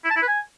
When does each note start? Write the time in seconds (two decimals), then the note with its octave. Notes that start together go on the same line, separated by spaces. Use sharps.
0.05 E4
0.10 A5
0.16 E4
0.22 B4
0.28 G#5